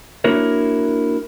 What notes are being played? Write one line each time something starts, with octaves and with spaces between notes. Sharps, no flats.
A#3 D4 E4 F#4 A#4 C#5